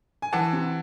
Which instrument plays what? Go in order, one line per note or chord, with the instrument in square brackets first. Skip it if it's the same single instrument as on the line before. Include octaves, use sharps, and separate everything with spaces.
[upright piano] G#5
E3 F#5 A5
C3